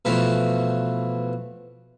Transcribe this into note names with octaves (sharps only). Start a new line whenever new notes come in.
B2 E3 F3 A3